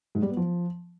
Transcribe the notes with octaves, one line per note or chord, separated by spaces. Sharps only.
G#2
G3
B3
F3